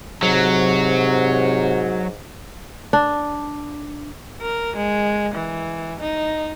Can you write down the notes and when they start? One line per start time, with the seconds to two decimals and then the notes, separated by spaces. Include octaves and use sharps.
0.23 G#2 C3 F#3
2.93 D4
4.41 A#4
4.76 G#3
5.34 E3
6.00 D#4